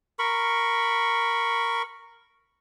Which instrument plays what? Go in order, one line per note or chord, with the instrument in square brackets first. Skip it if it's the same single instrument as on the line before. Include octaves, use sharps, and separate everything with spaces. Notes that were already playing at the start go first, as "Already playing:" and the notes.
[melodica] A#4 B5 C#6